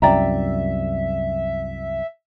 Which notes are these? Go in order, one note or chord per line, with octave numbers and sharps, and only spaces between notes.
C2 F#2 D5 E5 G5 A#5